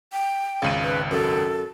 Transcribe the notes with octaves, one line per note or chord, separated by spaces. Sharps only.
G5
G#1 C#2 C#3 D#7
B4
F#2 A4